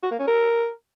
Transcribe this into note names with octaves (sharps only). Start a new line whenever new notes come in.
F#4
A#3
C#4
A#4